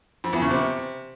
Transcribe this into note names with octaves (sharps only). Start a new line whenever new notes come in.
F2
E2
C#3
C3